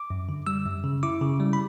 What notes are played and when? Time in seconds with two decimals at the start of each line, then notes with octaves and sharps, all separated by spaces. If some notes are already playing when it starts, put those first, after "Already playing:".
Already playing: D6
0.10 F#2
0.29 D3
0.47 G3 E6
0.66 F#2
0.84 C#3
1.03 E4 D6
1.21 C#3
1.40 G3
1.53 B5